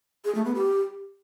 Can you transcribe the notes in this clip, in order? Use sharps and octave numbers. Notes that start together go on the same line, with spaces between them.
G#4
A3
B3
G4